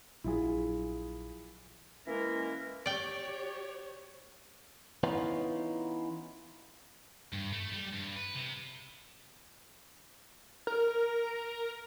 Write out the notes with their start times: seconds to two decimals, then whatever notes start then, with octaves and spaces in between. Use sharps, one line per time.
0.24 A#1 F#3 E4 F4 G#4
2.07 E3 G#3 A#3 C#4 E4 A#4
2.86 G4 C#5 D5 G5
5.03 E3 B3 C#4 D#4 F4
7.33 G2
7.53 A3
7.73 G3
7.93 G2
8.16 B4
8.35 C3
10.67 A#4